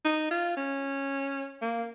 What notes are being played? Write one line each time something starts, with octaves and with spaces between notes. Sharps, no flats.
D#4
F4
C#4
A#3